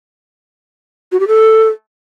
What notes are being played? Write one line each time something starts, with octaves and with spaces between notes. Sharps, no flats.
F#4
G4
A4